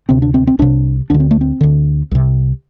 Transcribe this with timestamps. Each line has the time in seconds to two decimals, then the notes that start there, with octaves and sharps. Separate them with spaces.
0.09 D2 C3 C4
0.22 D4
0.34 C4
0.47 C4
0.59 C2 C3 D4
1.10 D2 D3 D4
1.20 C4
1.31 A3
1.41 C4
1.61 D2 D3
2.11 C2 C3